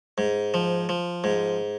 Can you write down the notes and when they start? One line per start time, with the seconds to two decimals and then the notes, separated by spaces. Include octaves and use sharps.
0.18 G#2
0.54 F3
0.89 F3
1.24 G#2